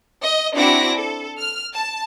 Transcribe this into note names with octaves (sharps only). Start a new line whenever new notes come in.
D#5
C4 D4 E4 F#4 D6 A#6
A4
F6
A5